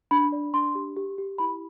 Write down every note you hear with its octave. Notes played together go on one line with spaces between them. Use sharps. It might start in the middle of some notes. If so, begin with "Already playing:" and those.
D4 B5
D5
D4 C6
G4
G4
G4
E4 B5